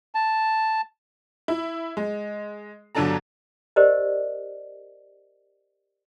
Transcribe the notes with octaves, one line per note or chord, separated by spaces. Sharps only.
A5
E4
G#3
G1 D3 F#3 D4 A4 A#5
G4 A#4 C5 D5 D#5